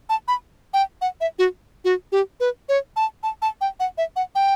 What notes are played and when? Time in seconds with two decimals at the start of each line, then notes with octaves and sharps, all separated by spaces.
0.09 A5
0.28 B5
0.74 G5
1.01 F#5
1.21 E5
1.39 F#4
1.85 F#4
2.12 G4
2.40 B4
2.69 C#5
2.96 A5
3.23 A5
3.42 A5
3.61 G5
3.80 F#5
3.98 E5
4.16 F#5
4.35 G5